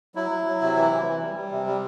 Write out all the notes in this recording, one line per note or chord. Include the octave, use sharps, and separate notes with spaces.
F#3 E4
F#3
F#3
C3
E3
E3
E3
G3
G3
C3
G3